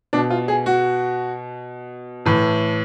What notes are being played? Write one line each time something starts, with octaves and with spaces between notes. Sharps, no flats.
B2 D4
F4
G#4
F#4
A2 E3